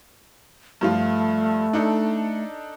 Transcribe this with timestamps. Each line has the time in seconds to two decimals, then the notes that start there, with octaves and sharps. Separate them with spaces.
0.81 G2 F3 A3 F4
1.73 D4 D#4 A4